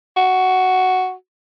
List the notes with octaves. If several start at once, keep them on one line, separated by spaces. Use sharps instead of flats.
F#4